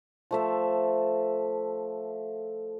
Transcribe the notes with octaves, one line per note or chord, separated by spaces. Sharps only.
F3 A3 E5